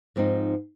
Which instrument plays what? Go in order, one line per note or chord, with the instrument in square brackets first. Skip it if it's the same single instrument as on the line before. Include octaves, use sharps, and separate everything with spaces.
[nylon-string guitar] G#2 F3 C4 D#4